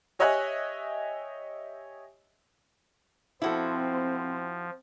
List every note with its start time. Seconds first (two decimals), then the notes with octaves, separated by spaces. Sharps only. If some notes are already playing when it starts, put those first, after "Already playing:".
0.19 G4 C#5 D#5 E5 G#5 F#6
3.42 F3 C4 E4 F#4 A4